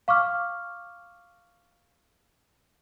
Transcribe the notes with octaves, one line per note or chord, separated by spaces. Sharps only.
F5 C#6 D6 F6